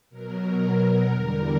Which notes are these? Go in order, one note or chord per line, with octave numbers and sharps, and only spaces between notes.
B2 F#3 A#4
E2 D3 G3